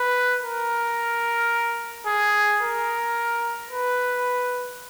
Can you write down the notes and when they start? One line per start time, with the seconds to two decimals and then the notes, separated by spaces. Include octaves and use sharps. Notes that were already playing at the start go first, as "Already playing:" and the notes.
Already playing: B4
0.44 A#4
2.07 G#4
2.61 A#4
3.71 B4